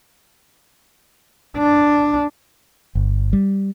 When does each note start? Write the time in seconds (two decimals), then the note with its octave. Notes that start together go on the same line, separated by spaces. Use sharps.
1.57 D4
2.95 G1
3.33 G3